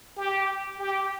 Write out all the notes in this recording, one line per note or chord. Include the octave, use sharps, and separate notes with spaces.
G4
G4